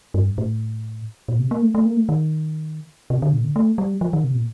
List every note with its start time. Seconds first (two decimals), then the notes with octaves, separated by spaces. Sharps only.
0.14 G2
0.38 A2
1.28 A#2
1.39 C3
1.51 A#3
1.62 A3
1.75 A3
1.86 A#3
1.96 A3
2.09 D#3
3.10 C3
3.22 D3
3.33 A#2
3.44 D3
3.56 A3
3.78 G3
4.01 F3
4.13 D#3
4.24 C3
4.35 A#2